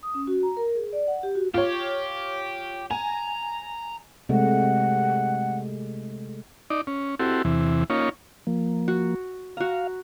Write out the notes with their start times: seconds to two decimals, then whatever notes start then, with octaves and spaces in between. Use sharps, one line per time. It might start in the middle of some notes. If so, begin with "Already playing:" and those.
0.03 D#6
0.15 C#4
0.27 F#4
0.43 A#5
0.57 A#4
0.75 G#4
0.93 D5
1.08 F#5
1.23 G4
1.35 F#4
1.54 F4 G4 C#5
2.91 G#5 A#5
4.29 C3 G#3 A3 F#5
6.70 D#4 D5
6.87 C#4
7.19 C4 E4 F#4 G4 A4
7.45 E2 C3 E3
7.90 A#3 C#4 D#4 F4 C#5
8.47 F3 A#3
8.88 F#4
9.57 F#4 F5 A#5